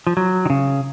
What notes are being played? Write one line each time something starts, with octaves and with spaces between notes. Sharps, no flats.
F3
F#3
D#3
C#3